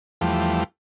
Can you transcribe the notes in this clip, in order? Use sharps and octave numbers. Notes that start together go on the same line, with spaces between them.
E2 F3 G3 A3